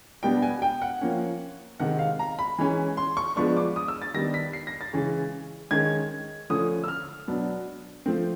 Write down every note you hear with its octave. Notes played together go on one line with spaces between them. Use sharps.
B2 G3 B3 D4 G5
G#5
G5
F#5
F3 A#3 C#4
C3 D#3 G#3 F#5
F5
A#5
B5
E3 G#3 C#4
C6
C#6
F3 G#3 B3 D4 C#6
D6
D#6
E6
A6
D#3 G3 B3 D4 A#6
B6
C7
A#6
A6
C#3 E3 G#3 C#4
D#3 G#3 C#4 G#6
D3 F3 A3 C#4 D#6
E6
F6
B2 F#3 B3 D4
F3 A3 C4